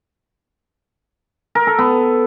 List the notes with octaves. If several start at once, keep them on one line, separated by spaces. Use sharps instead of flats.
A#4
A4
B3